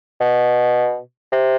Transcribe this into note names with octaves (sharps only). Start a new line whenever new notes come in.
B2
C3